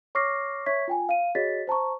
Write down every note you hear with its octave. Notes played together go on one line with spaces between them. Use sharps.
C#5 C#6 D6 F6 A#6 C7
C#5 E5 C#6 G#6 B6
F4 G5 G#5
F5 D#7
F#4 G#4 C#5 D#5 A6 B6
C5 A5 A#5 C#6